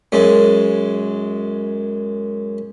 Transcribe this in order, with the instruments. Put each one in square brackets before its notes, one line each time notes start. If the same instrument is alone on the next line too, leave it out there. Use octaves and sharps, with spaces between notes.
[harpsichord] F#2 G#3